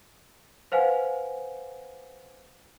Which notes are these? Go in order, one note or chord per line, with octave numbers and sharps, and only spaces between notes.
B4 C5 F5 F#5 G#5